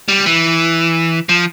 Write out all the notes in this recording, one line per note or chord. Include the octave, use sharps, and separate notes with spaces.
G3
E3
F3